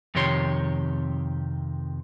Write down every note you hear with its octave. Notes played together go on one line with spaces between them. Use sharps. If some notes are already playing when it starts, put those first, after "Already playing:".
F2 C3 D#3 G4 C#5 C6